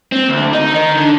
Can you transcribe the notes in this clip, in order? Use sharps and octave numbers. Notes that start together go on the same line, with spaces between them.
C4
D2
D#4
D#3
D3